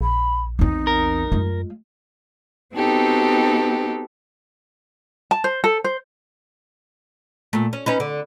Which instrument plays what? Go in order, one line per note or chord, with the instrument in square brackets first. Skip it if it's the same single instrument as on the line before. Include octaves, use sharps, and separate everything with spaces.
[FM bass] A#1 [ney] B5
[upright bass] E2 C4 [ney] D#4
[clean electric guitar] A#4
[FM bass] F#2 [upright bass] G#3 F4
[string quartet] B3 C4 D#4 F#4 G4 A4
[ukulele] A5
C5
A4
C5
[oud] A#2 A3
C#4
C#4 D#4 B4
D3